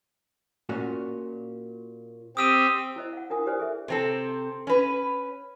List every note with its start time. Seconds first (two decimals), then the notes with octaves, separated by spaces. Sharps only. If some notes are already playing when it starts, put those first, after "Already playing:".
0.69 A#2 C#4 F#4
2.37 C4 G4 D#6 E6 D#7
2.96 E4 C5 D#5
3.13 F5 F#5
3.30 D4 E4 F4 A#4 G#5 D#6
3.46 G4 B4 C5 D5 G#5 D#6
3.59 G#4 A4 E5
3.88 C3 C4 A4
4.67 C#4 B4